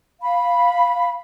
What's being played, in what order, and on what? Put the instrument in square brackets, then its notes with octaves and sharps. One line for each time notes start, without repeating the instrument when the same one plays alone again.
[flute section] F5 B5